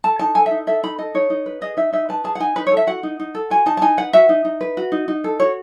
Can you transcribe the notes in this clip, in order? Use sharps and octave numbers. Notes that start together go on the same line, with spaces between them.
A4 A5
D#4 A5
A4 G#5
E5
D#4
A4 E5
D#4 B5
A4 D#5
D#4 C#5
D#4
B4
G#4 D#5
D#4 E5
D#4 E5
B4 A5
G#4 A5
F#5
D#4 G#5
D#4 B4
C#5
A4
E5
F#4 F#5
D#4
D#4
A4
F#4 G#5
D#4 A5
A5
D#4 G#5
B4 F#5
F#4 E5
D#4
D#4
B4
F#4
D#4
D#4
A4
F#4 C#5